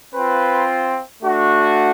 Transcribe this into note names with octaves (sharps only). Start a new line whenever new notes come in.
C4 F4 B4
A3 D4 F#4